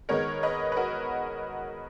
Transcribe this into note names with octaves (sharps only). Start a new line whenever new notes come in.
D#3 G#3 B3 A#4 C#5
B4 D#5
B4
F#4 A#4